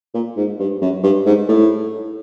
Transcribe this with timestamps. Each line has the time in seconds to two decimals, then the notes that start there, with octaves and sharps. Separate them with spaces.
0.14 A#2
0.37 G#2
0.60 G2
0.82 F#2
1.03 G2
1.26 G#2
1.48 A2